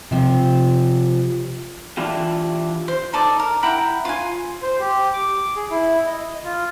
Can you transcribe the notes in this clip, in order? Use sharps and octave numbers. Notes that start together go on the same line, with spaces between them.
C3 F3
E3 D4 E4 F4 G4
C5
D#4 A4 D5
A#4
E4 F#5 G5 A#5
F4 G#5
C5
G4
D6
G#4
E4
D#5
F4